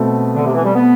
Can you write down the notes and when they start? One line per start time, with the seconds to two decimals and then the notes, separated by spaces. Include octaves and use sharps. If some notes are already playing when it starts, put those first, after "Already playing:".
Already playing: B2 A3 C4
0.35 D3
0.45 C3
0.55 E3
0.64 G3
0.75 B3